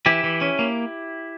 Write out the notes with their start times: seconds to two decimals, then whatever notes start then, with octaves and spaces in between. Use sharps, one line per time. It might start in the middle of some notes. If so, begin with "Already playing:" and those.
0.06 E3 E4 G4
0.24 E3
0.41 C#4
0.59 A#3